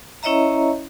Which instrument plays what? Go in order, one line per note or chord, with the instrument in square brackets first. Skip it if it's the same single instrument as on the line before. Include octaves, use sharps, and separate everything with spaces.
[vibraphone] C#4 E4 C#5 D#5 E5 A#5